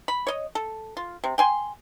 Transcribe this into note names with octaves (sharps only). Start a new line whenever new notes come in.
B5
C#5 D#5
A4
F4
C3
G5 G#5 C6